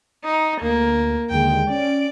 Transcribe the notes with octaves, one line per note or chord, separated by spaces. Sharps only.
D#4
D2 A#3
D#2 D3 G#3 G5
C#4 D5 D7